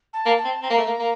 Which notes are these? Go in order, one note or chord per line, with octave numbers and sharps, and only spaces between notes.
A5
A#3
A5
C4
C4 A#5
A#3
A3
A#3
A#3